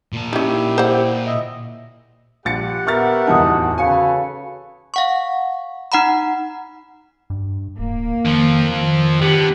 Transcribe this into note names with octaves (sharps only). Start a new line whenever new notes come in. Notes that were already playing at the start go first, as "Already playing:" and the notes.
A#2 A5
C#4 D#4 E4 G4
C5 F#5
D#5 E5
A#1 G4 F#5 A6 C#7
B3 A#4 E5 C#6 F6 A6
D1 E2 D#4 A5 D#6
C#3 F#4 A4 B4 C#5 F5 G#5 C#7
F5 F#5 C#6
D#4 F#5 A#5 B5
G2
D1 A#3
F2 D#3 F3
D#3
D3 B3 G4